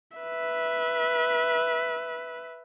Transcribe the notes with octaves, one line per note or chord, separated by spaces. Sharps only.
B4 E5